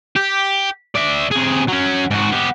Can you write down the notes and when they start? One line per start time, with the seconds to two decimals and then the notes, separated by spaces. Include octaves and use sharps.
0.16 G4
0.95 D5 E5
1.31 C3 G#4
1.68 F#3 C#4
2.11 G#2 F#4
2.32 B3 G4